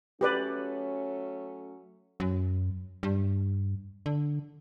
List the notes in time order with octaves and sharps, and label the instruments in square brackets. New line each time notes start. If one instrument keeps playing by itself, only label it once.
[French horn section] F#3 A3 C#4 [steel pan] G4 B4 D5
[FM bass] F#2
G2
D3